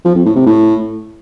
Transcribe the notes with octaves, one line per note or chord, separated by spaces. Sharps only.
F3
F2
A2
C3
A2